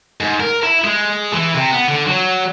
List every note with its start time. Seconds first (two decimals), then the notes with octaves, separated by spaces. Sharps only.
0.20 G#2
0.40 A#4
0.63 E4
0.84 G#3
1.33 E3
1.55 C3
1.71 B3
1.88 D3
2.07 F#3